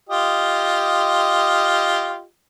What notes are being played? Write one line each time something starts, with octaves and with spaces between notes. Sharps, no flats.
F4 G4 D#5